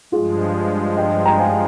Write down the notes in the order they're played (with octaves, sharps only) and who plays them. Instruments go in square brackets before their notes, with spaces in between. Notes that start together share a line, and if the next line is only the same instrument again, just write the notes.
[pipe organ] G2 F3 G#3 [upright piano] F4 G#4
[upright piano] D#5 G5
G5 A#5
F5 G#5